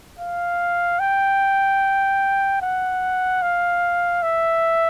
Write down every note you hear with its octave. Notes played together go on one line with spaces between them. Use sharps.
F5
G5
F#5
F5
E5